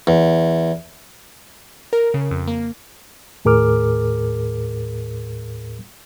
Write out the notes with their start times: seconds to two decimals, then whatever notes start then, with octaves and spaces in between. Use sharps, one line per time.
0.07 E2
1.93 A#4
2.14 C#3
2.31 F2
2.47 A#3
3.45 D#2 A2 G#4 A#4 D6 F6